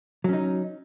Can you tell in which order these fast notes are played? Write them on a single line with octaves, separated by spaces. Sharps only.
F#3 C#4 D#4